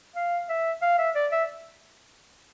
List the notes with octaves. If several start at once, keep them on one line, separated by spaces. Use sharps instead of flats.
F5
E5
F5
E5
D5
E5